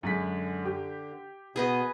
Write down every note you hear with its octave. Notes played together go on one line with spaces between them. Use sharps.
F#2 D3 G#3 B6
G4
B2 B3 G#4 B4 D#5